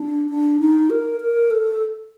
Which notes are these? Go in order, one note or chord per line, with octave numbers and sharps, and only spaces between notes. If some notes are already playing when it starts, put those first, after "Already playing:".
Already playing: D4
D4
D#4
A#4
A#4
A4